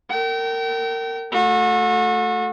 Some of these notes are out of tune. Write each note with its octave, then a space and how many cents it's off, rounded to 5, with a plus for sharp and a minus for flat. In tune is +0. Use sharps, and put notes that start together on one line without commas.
A#4 -30 G5 -35
A3 +0 F#4 -35